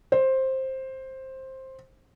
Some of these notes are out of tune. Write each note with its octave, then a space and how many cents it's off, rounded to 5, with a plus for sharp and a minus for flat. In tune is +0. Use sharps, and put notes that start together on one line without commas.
C5 +10